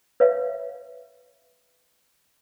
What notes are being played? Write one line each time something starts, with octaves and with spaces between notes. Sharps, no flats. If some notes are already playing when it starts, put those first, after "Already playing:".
B4 C#5 E5 F5